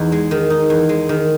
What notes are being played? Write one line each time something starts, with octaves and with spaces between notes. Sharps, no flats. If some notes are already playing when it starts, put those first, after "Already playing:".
Already playing: E2 D#4
G#3
D#3
D#4
E2
G#3
D#3